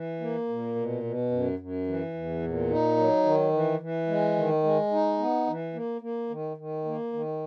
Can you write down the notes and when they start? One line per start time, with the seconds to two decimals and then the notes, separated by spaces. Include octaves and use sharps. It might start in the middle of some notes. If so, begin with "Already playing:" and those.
Already playing: E3
0.20 A#3
0.48 A#2
0.75 B2
1.03 B2
1.31 F#2
1.59 F#2
1.87 E3
2.14 E2
2.42 A#2
2.70 D#4
2.97 F#3
3.24 D#3
3.53 E3
3.80 E3
4.08 G#3
4.36 D#3
4.63 G#3
4.91 D#4
5.18 B3
5.47 E3
5.74 A#3
6.01 A#3
6.30 D#3
6.57 D#3
6.85 A#3
7.13 D#3